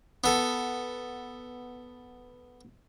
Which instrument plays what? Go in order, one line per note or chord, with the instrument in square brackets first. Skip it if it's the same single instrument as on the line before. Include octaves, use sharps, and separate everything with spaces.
[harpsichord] B3 A4